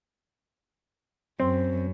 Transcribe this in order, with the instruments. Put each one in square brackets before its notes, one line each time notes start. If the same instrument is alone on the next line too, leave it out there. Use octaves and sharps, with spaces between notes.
[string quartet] F#2 [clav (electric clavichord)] C4